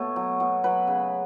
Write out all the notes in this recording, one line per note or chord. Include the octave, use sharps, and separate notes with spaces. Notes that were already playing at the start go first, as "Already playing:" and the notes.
Already playing: B2 A3 C#5
F#3
B2
F#3 B4
C#3